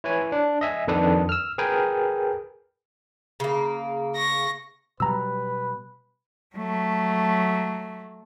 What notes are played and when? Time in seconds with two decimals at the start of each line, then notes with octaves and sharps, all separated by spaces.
0.04 E4 B4 C#5 G#5
0.32 D4
0.61 D#5 E5 G#5
0.88 F2 D#3 D4 A4 B4 D#6
1.29 E6 F6
1.58 G#4 A#4 B4 G5 G#5
3.40 C#3 A#3
4.16 C#6 A#6
5.00 B2 F#3 G3 B4 A#5 E6
6.56 F#3 A3